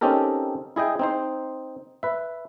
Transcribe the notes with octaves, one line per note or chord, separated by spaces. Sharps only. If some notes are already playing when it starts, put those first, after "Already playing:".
C4 C#4 D#4 G4 A4 A#4
E4 G#4 D#5 G5
C4 D#4 C5
B4 E5